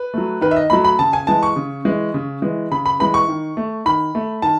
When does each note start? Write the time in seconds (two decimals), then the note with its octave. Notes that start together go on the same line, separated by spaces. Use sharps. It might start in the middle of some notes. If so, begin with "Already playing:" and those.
Already playing: B4
0.14 F#3 A3
0.41 D#3 B4
0.51 E5
0.56 D#5
0.70 F#3 A3 B5
0.84 B5
0.99 C#3 A5
1.13 G#5
1.27 E3 G#3 A5
1.43 C#6
1.56 C#3
1.85 E3 G#3
2.14 C#3
2.42 E3 G#3
2.71 C#3 B5
2.86 B5
2.99 E3 G#3 B5
3.14 C#6
3.28 D#3
3.57 A3
3.85 D#3 B5
4.15 A3
4.42 D#3 A5